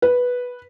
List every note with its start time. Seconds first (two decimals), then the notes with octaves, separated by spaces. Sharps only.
0.02 B4